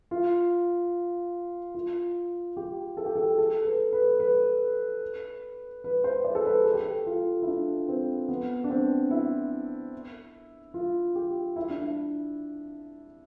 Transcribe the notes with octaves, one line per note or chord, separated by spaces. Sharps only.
F4
F4
G4
A4
G4
A4
A4
B4
B4
B4
B4
C5
D5
A4
B4
A4
G4
A4
F4
E4
D4
C4
B3
D4
C4
E4
F4
G4
E4
D4
E4